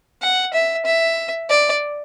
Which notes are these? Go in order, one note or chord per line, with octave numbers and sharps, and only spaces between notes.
F#5
E5
E5
D5